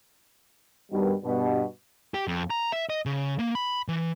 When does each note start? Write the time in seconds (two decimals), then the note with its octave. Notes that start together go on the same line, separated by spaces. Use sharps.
0.92 G2 B2 D#3 G3
1.24 G2 B2
2.14 G4
2.27 F2
2.50 A#5
2.72 E5
2.90 D#5
3.06 C#3
3.39 A#3
3.55 B5
3.88 E3